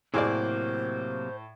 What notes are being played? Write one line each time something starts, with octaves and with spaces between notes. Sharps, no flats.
A2 C3 F#3 A#3 G#4 C5 D5